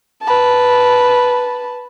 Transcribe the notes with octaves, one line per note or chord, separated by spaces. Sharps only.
B4 A5